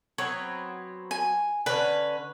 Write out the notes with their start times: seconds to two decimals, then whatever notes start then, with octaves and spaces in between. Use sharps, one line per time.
0.18 F#3 B3 C4 C#5
1.11 G#5
1.66 D3 C#4 B4